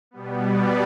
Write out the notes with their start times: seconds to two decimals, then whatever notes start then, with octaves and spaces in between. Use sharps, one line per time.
0.11 B2 G3 B3
0.41 D5